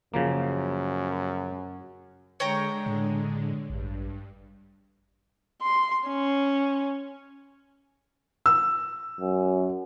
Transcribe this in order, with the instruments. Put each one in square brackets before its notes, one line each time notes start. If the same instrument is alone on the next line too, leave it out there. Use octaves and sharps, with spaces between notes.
[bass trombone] F#2 [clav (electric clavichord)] C#3 F3 A#3
[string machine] D3 G#3 [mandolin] C#5 G5 A#5
[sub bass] A2
[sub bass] A1 [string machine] G2
[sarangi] C6
C#4
[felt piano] E6
[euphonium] F#2